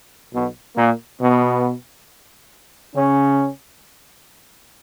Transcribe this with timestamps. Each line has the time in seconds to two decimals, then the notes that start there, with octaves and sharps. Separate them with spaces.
0.33 B1 B2
0.77 A#2 A#3
1.21 B2 B3
2.94 C#3 C#4